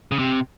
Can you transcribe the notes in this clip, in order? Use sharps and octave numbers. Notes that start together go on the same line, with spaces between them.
C#3
C3